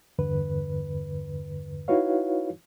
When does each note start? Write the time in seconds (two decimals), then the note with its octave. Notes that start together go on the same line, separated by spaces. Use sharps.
0.19 E2 G2 D3 B4
1.88 D#4 E4 F#4 B4 C#5 F5